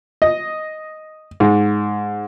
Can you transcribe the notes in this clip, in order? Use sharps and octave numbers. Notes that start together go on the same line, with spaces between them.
D#5
G#2